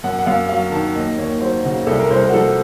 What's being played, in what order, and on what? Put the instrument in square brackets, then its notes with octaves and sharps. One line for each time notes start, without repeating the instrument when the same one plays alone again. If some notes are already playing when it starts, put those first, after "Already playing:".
[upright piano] F#2 F#5
F#5
F#2 F5
F#3 F5
D#3 A5
D#2 D#5
D#2 C#5
F#3 C5
C#3 F#4
C2 A4
A#4
C2 C5
A#4
F#4
F3 A4